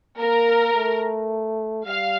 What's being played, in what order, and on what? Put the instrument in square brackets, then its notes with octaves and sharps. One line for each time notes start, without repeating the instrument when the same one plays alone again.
[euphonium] A#3 [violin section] A#4
[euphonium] A3
[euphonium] G3 [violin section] F5